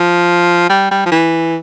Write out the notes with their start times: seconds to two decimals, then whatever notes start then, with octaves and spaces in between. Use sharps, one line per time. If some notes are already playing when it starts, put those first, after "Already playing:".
Already playing: F3
0.70 G3
0.91 G3
1.06 F3
1.12 E3